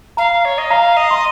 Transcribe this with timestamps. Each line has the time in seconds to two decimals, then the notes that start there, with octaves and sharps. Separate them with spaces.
0.17 F5 A#5
0.44 C#5
0.58 D#5
0.70 F5 A#5
0.96 D#5
1.11 C6